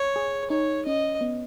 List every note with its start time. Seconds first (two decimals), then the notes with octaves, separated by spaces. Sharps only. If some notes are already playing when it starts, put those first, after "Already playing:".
Already playing: C#5
0.16 G#4
0.50 D#4 C#5
0.86 C#4 D#5
1.21 B3